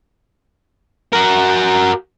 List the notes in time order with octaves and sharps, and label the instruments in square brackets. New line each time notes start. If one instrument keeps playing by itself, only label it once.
[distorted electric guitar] F#4 A#4